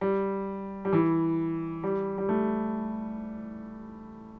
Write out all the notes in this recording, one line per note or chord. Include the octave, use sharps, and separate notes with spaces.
G3
G3
E3
G3
G3
A3